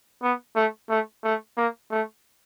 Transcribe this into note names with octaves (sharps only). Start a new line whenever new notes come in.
B3
A3
A3
A3
A#3
A3